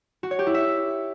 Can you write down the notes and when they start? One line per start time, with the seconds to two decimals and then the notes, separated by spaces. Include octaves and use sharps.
0.23 F#4
0.31 C#5
0.39 G4
0.47 E4
0.54 E5